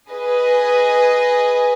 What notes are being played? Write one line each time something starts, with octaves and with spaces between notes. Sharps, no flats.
G#4 B4 D#5